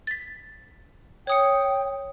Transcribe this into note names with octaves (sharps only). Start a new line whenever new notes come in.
A6 B6
C#5 G5 D#6 C#7